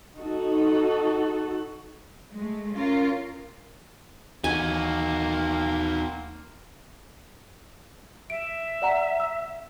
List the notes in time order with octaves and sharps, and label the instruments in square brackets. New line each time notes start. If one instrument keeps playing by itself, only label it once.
[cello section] D#4 F#4 A4
G#3 A3
C#4 F4 A#4
[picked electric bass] D#2 E3 [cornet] A#3 [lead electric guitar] D#4 F#4 [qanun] G#5
[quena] E5 [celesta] D7
[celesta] D5 F#5 A#5
E6